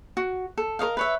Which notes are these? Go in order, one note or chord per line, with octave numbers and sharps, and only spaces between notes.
F#4
A4
A#4 C#5 D#5 F5
B4 C#5 E5